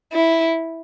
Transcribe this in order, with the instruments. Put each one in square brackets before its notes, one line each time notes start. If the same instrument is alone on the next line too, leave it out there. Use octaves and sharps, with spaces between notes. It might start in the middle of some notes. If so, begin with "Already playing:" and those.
[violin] E4